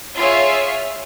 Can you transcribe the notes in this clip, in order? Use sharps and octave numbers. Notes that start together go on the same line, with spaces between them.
F4 G#4 C#5 E5 F5